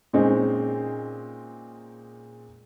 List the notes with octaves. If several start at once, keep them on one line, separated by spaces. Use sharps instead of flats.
A#2 G#3 C4 C#4 D#4